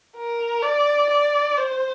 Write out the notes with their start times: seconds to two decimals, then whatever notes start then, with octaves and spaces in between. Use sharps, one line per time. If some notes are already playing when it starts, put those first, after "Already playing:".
0.16 A#4
0.63 D5
1.10 D5
1.58 C5